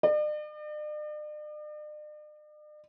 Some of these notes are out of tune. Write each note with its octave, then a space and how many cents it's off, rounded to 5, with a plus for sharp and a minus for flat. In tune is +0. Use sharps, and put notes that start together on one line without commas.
D5 +45